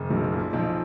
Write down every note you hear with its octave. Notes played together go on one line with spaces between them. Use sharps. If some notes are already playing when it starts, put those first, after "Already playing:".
Already playing: F#1
B1 F#3
A#2
B1 F3